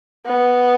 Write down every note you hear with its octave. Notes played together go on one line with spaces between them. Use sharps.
B3